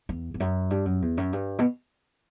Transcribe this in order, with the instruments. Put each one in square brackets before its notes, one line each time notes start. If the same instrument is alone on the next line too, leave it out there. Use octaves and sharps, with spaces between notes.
[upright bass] E2
E2
F#2
G2
F#2
E2
F#2
G2
B2